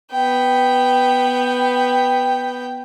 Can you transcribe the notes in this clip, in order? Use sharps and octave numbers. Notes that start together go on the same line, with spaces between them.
B3 G5